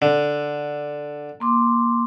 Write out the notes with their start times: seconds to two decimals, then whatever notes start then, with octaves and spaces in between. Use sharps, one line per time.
0.02 D3
1.40 A#3 C6 D6